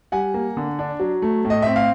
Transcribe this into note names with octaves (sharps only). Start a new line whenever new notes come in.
G3 F#5 G#5
A#3
D3
D4
F#3
A3
A2
D#5
C4 E5
F5